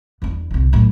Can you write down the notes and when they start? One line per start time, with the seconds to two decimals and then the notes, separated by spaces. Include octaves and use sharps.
0.22 E2 D4
0.51 C2 D3
0.73 F#2 A2